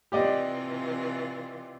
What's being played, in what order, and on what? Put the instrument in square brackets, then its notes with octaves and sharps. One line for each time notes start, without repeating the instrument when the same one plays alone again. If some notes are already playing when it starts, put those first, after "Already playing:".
[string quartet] C3 E3 F4 [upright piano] G4 D5 D#5